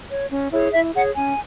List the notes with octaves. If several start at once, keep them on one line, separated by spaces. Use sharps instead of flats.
C#5
C#4
E4 G#4 C#5
E4 E5
G#4 C#5 F#5
C#4 G#5